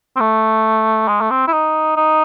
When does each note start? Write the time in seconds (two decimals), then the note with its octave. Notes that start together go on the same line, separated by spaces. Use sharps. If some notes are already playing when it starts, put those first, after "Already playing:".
0.16 C4
0.20 A3
1.08 G#3
1.21 A3
1.31 C4
1.47 E4
1.53 D#4
1.97 D#4